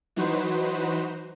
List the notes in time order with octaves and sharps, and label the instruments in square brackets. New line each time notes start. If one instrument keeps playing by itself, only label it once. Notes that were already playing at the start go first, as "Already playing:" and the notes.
[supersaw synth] E3 F#3 D#4 F#4 B4 C5